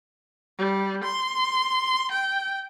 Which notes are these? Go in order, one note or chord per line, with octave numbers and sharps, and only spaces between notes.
G3
C6
G5